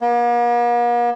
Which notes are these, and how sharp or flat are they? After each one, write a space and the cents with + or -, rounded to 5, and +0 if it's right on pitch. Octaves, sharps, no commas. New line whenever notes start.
A#3 +45